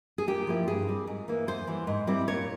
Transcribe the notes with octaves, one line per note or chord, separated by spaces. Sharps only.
G#4
A#2 G4
F3 A#3 E4
G2 G#4
G3 C4
G#2
E3 A#3
E2 C5
E3 G3
G#2
G3 C4 E4
A#2 C#5